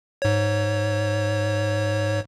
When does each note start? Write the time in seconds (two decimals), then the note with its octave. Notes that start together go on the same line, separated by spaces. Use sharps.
0.22 G#2 C#5